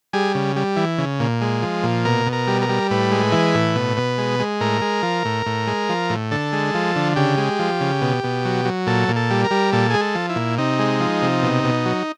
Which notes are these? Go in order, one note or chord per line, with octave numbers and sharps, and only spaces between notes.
G3 G#4
C#3
G3
E3
C#3
A#2
G#3
F3
A#2
B2 A#4
B2
A#4
G3
A#4
G3
A2 B4
G#3
E3
A2
B2
B2
G#3
G#3
A2 A#4
G#3
F3
A2
A2
G#3
F3
A2
D3 A4
G#3
F3
D3
C#3 G4
G#3
F3
C#3
B2
B2
F#3
F#3
A#2 A4
A#2
A4
G3
A#4
G3
A#2 A4
G#3 G#4
A4
F3
E4
A#2
C3 D#4
G#3
F3
C3
B2
B2
F#3